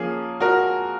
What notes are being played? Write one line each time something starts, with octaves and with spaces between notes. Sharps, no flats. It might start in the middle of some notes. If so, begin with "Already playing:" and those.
Already playing: F3 A#3 C#4 G#4
F#4 A#4